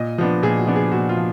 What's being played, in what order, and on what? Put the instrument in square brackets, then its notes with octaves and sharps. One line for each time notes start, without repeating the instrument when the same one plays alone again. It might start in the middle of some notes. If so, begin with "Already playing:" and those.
Already playing: [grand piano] A#2 D#5
F3 B3 D4
A#2 G#4
F#4
F3 B3 D4
G#4
A#2 F#4
F4
F3